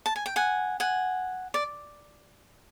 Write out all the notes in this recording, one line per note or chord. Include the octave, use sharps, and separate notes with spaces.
A5
G#5
G5
F#5 G#5
F#5 G#5
D5